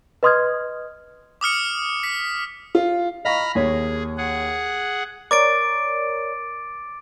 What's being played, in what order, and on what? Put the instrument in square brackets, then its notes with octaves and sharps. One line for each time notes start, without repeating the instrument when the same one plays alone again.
[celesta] B4 D#5 C6 D#6 F6 G#6
[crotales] D6 D#6 F6 C#7
B6
[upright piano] F4
[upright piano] D#5 F5 C#6 [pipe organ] A#5 B5 F6
[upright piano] D#2 C#5 [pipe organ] G#4
[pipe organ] G#4 F#5
[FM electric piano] A#4 C#5 D5 [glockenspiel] D6 A6 D7